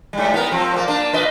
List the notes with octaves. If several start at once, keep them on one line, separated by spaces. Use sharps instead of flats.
G#2 G3
B3 A#4
F3 C4
A#2 A#3
A#3 D4
A#2 B4 D#5